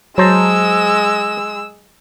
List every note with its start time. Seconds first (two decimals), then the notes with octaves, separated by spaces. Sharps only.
0.18 F#3 G#3 C5 A5 A#5 E6